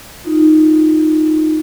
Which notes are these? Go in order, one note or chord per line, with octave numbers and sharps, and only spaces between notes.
D#4 F4